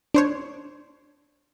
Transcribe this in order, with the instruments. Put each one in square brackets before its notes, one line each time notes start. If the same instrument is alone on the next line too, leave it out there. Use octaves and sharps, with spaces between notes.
[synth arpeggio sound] D4 C5 C#5